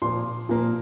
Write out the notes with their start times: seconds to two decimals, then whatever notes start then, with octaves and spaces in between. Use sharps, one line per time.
0.02 A#2 F3 A#3 C6
0.49 A#2 F3 A#3